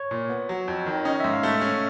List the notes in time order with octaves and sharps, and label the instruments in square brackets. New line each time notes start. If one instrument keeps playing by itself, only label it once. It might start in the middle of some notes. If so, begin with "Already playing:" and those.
Already playing: [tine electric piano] C#5
[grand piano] A#2
B3
F#3
F2
D#3
[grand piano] C#4 [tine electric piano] D#5
[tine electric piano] E5
[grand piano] G#2
[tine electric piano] F5
[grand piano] A3 [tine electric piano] E5
[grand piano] C#4